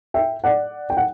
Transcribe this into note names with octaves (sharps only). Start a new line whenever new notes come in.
E5 G5
D5 F#5
G5
F#5